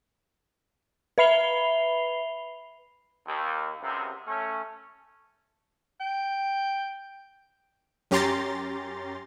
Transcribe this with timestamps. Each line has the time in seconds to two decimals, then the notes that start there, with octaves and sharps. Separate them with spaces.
1.18 B4 E5 B5 C7 F7 G7
3.26 D#2
3.82 C#2 F#2 C3
4.26 A3 C#4
6.00 G5
8.11 F#2 C#4 G4 A#5 C6 A6